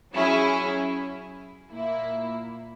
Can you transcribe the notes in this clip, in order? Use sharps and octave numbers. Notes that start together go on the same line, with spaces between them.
F#3 C#4 E4 G#4
A#2 A#3 E4